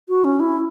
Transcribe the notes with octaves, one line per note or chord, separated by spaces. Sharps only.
F#4
C#4
E4